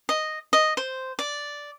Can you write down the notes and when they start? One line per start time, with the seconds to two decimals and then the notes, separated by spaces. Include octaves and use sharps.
0.09 D#5
0.53 D#5
0.77 C5
1.19 D5